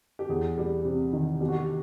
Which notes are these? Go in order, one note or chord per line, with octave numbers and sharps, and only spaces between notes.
G4
E2 G#4
G3
C3
D#3
B2 G4
F#4
G4